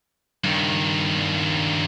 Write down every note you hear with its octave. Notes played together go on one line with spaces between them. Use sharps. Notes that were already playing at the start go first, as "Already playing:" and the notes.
G2 D#3